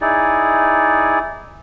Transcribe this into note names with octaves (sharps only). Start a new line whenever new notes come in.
D#4 E4 G#4 D5